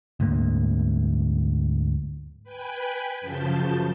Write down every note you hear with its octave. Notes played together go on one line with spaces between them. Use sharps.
D2 G#2 A#3
B4 G5 G#5 B5
F#2 C#3 F3 A5 G6